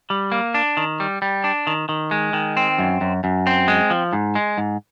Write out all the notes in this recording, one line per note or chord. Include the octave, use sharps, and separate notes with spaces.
G3
A#3
D4
D#3
G3
G3
D4
D#3
D#3
G#3
D#3
C4
F#2
F#2
F#2
C4
G#3
F3
G#2
G#3
G#2